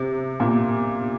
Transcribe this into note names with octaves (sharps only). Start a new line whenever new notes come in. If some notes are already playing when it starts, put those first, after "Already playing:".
Already playing: C3
A#2